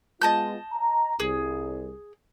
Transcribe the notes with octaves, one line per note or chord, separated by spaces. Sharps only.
G#3 B3 F4 D#5 A5 G6
A#5
C2 G#4